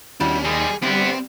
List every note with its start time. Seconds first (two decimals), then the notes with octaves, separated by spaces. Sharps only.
0.20 D#2 G3 C#4 D4 E4 F#4
0.45 B2 D#3 G3 G#3 G#4
0.83 D3 G3 B3 C4 E4 C5